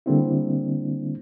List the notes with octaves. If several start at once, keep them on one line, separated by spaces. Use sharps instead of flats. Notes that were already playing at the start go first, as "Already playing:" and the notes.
D3 G3 A#3 C4 D4 E4